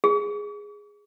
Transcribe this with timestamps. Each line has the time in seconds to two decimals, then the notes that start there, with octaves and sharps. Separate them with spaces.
0.04 G#4